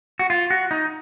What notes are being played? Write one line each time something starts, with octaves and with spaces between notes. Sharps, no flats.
F#4
F4
F#4
D#4